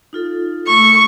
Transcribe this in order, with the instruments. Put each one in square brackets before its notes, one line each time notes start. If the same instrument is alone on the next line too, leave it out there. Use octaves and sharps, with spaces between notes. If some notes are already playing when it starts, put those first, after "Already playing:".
[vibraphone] D#4 F4 A4
[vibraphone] A3 E6 [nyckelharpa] C#6